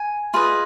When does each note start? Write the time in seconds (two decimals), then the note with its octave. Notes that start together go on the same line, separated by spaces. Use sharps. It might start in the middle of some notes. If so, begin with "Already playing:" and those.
Already playing: G#5
0.34 F4 G#4 B4 D#5